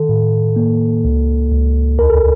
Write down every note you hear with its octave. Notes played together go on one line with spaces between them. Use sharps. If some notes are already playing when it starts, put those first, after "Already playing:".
Already playing: D#3 A4
A2
A#3
C#2
C#2
D#2 A#4
A4